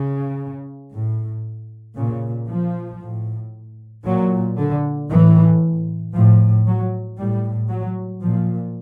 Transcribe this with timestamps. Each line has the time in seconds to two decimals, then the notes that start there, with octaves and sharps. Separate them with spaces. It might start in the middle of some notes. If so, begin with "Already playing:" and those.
Already playing: C#3
0.93 A2
1.97 A#2 C#3
2.49 F3
3.00 A2
4.05 A#2 F#3
4.57 D3
5.09 A2 E3
6.14 A2 F3
6.66 F#3
7.19 A2 G3
7.69 F#3
8.22 A#2 F3